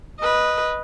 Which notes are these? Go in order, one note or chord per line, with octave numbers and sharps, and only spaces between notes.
B4 D#5